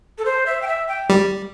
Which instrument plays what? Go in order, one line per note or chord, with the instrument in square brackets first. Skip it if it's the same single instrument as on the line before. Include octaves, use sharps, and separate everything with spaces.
[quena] A4
C5
E5
G5
E5
G5
[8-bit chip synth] G3